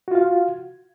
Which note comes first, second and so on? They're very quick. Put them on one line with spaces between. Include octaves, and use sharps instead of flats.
F#4 F4 F5